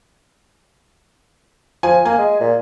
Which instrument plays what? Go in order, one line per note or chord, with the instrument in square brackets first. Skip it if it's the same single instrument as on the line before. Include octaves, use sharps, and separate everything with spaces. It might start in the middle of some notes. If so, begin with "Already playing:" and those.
[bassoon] F3 [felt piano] G#5
[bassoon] A#3 [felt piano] G#5
[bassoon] G#3
A#2